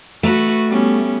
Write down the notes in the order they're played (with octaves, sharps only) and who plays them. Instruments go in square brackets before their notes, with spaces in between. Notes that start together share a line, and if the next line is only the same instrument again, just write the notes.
[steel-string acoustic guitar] A3 [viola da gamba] F#4 B4
[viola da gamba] G3 B3 C#4